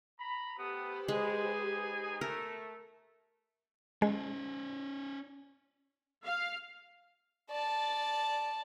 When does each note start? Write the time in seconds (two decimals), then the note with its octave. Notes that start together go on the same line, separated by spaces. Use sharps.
0.20 A#5 B5
0.58 A3 B3 G4 B4 C5 D#6
1.08 G#3 D#4 G#4 G#5
2.21 A3 A#4
4.02 G#3 C#4 C5
6.25 F5
7.50 D5 A5